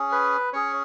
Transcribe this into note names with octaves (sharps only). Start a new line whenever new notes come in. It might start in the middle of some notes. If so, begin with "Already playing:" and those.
Already playing: C#4 G#4
B4
C#4 G#4 C#5